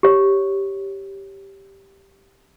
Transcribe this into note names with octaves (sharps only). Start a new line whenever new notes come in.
G4 C#5